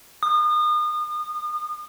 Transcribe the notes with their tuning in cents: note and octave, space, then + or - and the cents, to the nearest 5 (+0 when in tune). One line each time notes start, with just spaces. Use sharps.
D#6 -35